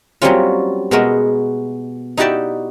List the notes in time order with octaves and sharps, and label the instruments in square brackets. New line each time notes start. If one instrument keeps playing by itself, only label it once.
[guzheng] F#3 G3 A#3 C4 C#4 F4
B2 G#3 B3 F#4 A#4 E5
D#4 E4 F#4 G4 D5 E5